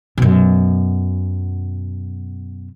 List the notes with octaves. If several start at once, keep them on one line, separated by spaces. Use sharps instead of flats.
F#2 B2